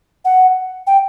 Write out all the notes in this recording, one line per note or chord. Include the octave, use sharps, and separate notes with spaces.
F#5
G5